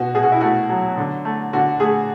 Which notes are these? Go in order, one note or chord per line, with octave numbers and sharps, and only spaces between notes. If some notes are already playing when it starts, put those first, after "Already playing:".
Already playing: B2 F#4
B2 G#4
F#4
E4
A3 F#4
F#3
D3
A3
D3 F#4
A3 G#4